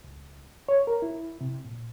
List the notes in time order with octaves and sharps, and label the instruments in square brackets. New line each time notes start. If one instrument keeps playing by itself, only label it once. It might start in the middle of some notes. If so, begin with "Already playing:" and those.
[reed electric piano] C#2
C#5
A#4
E4
C3
A#2